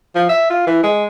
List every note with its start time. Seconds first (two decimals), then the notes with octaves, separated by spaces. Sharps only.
0.15 F3
0.29 E5
0.50 F4
0.67 E3
0.83 G#3